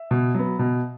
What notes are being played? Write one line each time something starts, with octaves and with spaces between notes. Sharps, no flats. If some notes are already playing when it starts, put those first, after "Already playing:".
Already playing: E5
B2
F#3 B3
B2